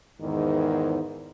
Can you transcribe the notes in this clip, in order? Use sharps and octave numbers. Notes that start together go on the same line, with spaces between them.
E2 G#2 D#3